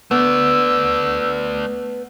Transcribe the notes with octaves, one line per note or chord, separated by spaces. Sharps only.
A3 B3 D5 E6